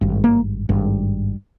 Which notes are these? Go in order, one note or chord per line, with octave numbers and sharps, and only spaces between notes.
G#1 G2
A#3
G#1 G2